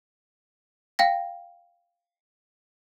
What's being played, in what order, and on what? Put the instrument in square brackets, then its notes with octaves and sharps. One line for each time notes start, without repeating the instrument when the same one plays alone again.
[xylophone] F5 G5 A#6